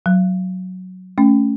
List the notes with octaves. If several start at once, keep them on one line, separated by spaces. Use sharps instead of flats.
F#3
A3 C#4